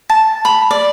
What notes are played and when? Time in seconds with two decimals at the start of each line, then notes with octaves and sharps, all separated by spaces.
0.10 A5
0.45 B5
0.71 D5